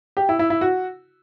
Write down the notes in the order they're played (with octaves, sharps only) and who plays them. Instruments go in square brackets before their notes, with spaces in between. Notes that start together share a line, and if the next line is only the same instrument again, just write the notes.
[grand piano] G4
E4
E4
E4
F#4